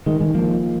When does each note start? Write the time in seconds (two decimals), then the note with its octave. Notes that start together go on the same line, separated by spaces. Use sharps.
0.06 D#3 G#3
0.20 D#3 G#3
0.35 F3 A#3